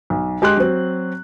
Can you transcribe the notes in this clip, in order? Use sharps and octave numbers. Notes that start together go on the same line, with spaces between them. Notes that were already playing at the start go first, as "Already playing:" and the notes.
B1
G#3 G4 G#5 C6 F#6
F#3 C4